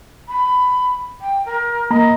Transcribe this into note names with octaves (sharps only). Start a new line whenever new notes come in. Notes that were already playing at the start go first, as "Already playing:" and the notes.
B5
G5
A#4
A#3 D#5 A#5 B5